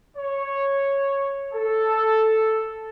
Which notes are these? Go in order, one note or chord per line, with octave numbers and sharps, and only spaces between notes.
C#5
A4